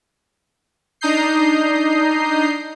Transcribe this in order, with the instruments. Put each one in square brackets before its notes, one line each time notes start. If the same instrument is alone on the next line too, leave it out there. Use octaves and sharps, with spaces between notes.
[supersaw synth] D4 D#4 A#5 D#6 G6 C7